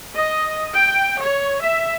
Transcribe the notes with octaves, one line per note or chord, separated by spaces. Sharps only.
D#5
G5
C#5
E5